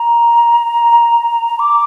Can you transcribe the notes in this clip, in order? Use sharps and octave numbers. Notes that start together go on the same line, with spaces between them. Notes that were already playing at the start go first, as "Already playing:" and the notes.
Already playing: A#5
D6